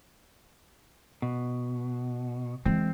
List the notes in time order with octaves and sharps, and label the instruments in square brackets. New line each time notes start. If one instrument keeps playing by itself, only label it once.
[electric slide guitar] B2
[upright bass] E3 G#3 [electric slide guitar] C4